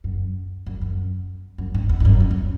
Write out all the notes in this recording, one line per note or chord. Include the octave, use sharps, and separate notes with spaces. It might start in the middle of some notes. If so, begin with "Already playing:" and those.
F#2
F#2
F#2
F#2
G#2
E2
G#2
F#2
E2
F#2